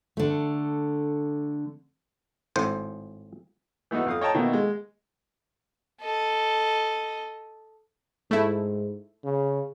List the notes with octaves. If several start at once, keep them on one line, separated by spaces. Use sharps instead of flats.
D3 A3
G#1 A2 C5
E3 A3 B3 D#4 F#4
F2 F5 D#6
C#5 D#5 G5 A5 A#5
B2 D#3 A3 A#3
G#3
A4 D#5
G#2 A3 E4
C#3